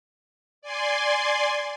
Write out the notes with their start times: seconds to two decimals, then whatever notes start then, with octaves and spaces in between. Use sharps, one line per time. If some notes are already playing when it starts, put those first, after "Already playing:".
0.62 D5 G#5 C6